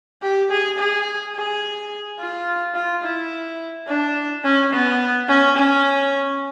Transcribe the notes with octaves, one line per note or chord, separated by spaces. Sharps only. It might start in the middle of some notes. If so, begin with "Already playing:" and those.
G4
G#4
G#4
G#4
F4
F4
E4
D4
C#4
B3
C#4
C#4